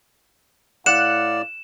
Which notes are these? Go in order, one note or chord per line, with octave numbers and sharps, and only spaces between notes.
A2 D5 F5 F#5 E7